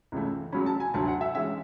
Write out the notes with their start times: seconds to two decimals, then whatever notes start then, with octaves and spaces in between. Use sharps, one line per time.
0.12 C#2 C#3 E3 A3
0.52 F#2 C#3 F#3 C#4 B5
0.66 A5
0.80 G#5
0.94 D2 D3 F#3 A5
1.08 F#5
1.21 E5
1.35 E3 G#3 C#4 E5